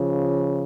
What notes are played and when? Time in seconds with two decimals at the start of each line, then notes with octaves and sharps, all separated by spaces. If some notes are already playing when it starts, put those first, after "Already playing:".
Already playing: C#3 F3